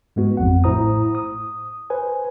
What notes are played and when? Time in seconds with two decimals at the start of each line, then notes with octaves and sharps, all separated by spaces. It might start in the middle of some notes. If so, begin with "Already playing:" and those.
0.16 G#2 G#3 B3 F#4
0.37 A1 F2 F#3 F#5
0.64 A2 E4 C5 A#5 D#6
1.15 D#6
1.90 B4 C5 G#5